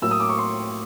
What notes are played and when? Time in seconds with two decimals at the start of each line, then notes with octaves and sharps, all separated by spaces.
0.02 A2 F#3 A#3 E6
0.11 D#6
0.20 D6
0.29 C#6
0.38 C6